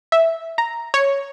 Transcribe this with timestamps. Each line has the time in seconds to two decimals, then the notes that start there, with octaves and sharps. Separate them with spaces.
0.12 E5
0.58 A#5
0.94 C#5